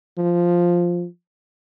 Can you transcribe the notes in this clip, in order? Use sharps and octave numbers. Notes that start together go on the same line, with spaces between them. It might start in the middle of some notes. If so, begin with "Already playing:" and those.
F3